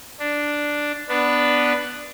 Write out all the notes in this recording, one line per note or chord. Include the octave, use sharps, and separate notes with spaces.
D4
B3 D4 B4